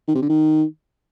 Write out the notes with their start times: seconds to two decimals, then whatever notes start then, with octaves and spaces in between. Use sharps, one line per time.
0.08 D#3
0.15 C3
0.22 D3
0.29 D#3